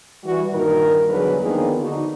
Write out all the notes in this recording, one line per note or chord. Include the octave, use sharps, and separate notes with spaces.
E3 G3 F#4
G2 A#2 D#3 A#4
E2 D3 F#3 G3 G#4 B4
D#3 F3 A#3 B3 D4 G#4
D3 D#4 F#4